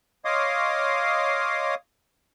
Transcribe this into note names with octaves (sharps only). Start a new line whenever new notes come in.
C#5 D#5 F5 C6 D6 D#6